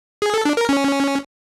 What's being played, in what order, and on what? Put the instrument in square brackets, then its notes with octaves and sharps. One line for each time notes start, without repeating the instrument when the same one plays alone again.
[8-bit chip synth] G#4
A4
D4
A#4
C#4